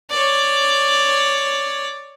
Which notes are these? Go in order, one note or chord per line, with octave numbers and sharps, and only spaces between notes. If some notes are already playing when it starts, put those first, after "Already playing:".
C#5 D5